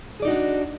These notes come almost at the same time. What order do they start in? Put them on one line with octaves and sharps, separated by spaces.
G#4 D5 D#4 F#4 D4